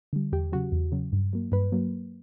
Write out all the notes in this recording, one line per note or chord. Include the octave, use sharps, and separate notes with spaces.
D3 G3
E2 G4
C#3 F#3 F#4
E2
C#3 F#3
G2
F#3 A#3
G2 B4
F#3 A#3